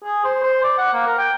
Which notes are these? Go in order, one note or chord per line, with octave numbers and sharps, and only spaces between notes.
G#4
C5
C5
D5
F#5
A#3
A#4
G5